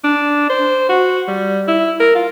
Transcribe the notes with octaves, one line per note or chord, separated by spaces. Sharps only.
D4
C5
F#4
G3
E4
A#4
F4